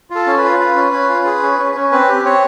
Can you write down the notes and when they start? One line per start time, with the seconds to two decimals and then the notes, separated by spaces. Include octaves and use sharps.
0.10 F4 A4
0.27 C#4
0.38 B4
0.43 F4
0.60 F4
0.76 C#4
0.93 C#4
1.09 F4
1.26 G#4
1.43 C#4
1.59 C#4
1.75 C#4
1.92 C4 B4
2.09 G4
2.25 C4 C#5